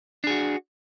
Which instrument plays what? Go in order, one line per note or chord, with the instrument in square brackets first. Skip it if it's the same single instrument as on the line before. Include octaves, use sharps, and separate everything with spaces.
[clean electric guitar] D4
G#4
F#4